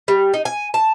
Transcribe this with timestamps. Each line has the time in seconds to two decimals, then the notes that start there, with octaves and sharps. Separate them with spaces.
0.08 G3
0.34 D#4
0.45 G#5
0.74 A5